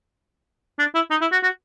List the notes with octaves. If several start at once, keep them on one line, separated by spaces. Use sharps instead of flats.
D4
E4
D#4
E4
F#4
F#4